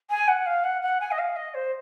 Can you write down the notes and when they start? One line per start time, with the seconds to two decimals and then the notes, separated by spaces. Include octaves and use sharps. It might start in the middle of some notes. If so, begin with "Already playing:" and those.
0.10 G#5
0.28 F#5
0.46 F5
0.64 F#5
0.82 F#5
1.01 G#5
1.11 D#5
1.18 F5
1.36 D#5
1.54 C5